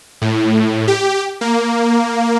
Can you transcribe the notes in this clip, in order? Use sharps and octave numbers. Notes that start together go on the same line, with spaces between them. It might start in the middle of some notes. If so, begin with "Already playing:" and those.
A2
G4
A#3